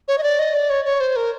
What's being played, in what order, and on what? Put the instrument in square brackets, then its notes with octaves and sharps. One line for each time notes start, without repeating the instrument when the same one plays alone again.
[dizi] C#5
D#5
D5
D#5
D5
C#5
C#5
C5
A#4